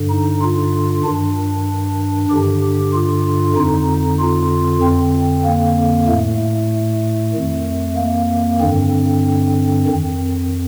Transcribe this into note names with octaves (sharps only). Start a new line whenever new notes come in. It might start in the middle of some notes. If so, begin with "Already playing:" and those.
Already playing: G2 D3
D#4
F4
G2 D#3 D4
G2 D3 G4
F4
F2 D3 D#4
F4
F2 D3 C4
A#3
A2 A3
F2 D#3
A#3
G2 D3 C4
F2 D#3